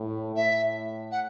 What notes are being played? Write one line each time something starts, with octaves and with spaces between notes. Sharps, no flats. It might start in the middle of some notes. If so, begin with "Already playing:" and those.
Already playing: A2
A2 E5
F#5